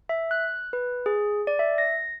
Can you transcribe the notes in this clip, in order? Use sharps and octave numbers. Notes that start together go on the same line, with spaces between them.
E5
F#6
B4
G#4
D5
E5
A#6